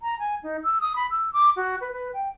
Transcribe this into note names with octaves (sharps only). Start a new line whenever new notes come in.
A#5
G#5
D#4
E6
D#6
B5
E6
D6
F#4
B4
B4
G5